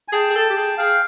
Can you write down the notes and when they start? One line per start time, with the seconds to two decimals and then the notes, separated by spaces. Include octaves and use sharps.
0.08 G#5
0.12 G#4 G5 A5
0.30 G#4
0.35 A4
0.50 G4
0.57 G#4
0.78 G#4 F5 G5